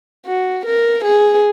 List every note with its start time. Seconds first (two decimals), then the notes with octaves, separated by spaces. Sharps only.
0.26 F#4
0.66 A#4
1.04 G#4